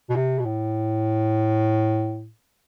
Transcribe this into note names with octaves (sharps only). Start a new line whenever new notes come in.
B2
C3
B2
A2